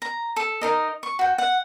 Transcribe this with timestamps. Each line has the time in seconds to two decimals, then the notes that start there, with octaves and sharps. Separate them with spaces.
0.02 A#5
0.36 A4
0.61 D#4 A#4 D#5
1.03 C#6
1.19 F#4 G5
1.38 F#5